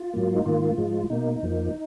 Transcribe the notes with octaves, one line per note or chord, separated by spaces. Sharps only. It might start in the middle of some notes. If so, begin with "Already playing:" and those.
Already playing: F4
G#2 F#3 A#3
D#4
G#2 D#3 A#3 F4
G#2 F3 G#3
B2 A#3 D#4
F2 F3 A#3